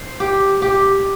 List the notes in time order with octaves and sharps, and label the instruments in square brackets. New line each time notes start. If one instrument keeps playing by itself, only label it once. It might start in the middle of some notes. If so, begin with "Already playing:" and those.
Already playing: [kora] C5
G4
G4